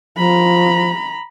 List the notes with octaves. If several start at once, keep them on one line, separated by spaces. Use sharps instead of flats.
F3 A#5 B5